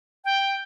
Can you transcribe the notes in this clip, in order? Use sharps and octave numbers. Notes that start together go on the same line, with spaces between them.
G5